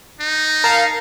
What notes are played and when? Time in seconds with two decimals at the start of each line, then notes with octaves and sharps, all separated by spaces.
0.21 D#4
0.64 A#4 F5 A5 A#6